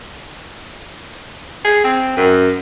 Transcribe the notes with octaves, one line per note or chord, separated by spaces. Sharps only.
G#4
C4
F#2